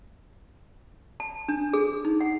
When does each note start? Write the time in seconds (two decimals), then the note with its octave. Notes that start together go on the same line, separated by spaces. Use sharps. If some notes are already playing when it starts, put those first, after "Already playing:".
1.20 A5
1.48 D4
1.73 G#4
2.05 D#4
2.21 F#5